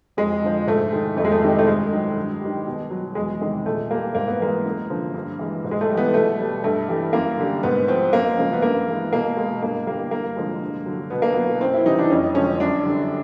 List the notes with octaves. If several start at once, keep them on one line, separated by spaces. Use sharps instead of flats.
F2 G#3
D3 F3
G#2 A3
D#3 G#3
F2 A3
G#3
A3
C3 D#3 G3
A3
G2 G#3
D#3 F#3
G2
D#3 G3
B2
F#3
E2 G#3
C3 D#3 G#3
A#2 A3
G3 A#3
G#2 A#3
B3
E3 G#3 A#3
F#2
D3 F3
G2
E3 G#3
G#2
G#3
A3
G3
E3 B3
B2 A3
G3
G2 A3
E3 G3
F#2 A#3
D3 G3
G#2 B3
F3 G#3 C4
F#2 A#3
C#3 F3 G#3
B3
G2 A#3
E3 G#3
B2 A#3
G#3
G2 A#3
D3 G3 A#3
G2 A#3
D3 F3 G#3
G2
D3 F#3
B2 B3
A#3
F#3 B3
F#2 C4
E4
C#3 E3 G3 D#4
D4
F2 C#4
D3 F3 G#3 C#4
F#2 D4
D3 G3